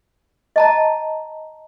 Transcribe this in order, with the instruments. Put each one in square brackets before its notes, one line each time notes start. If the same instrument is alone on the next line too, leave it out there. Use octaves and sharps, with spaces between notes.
[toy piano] D#5 A5 A#5